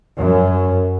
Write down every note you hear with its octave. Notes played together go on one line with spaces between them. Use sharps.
F#2